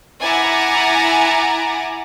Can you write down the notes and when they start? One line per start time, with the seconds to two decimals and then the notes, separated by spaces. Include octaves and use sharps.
0.21 E4 F#5 G#5 A#5 D6 A6